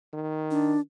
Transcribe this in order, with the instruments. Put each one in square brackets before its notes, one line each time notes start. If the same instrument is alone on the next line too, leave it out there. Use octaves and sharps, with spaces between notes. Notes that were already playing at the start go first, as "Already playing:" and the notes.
[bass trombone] D#3
[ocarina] D4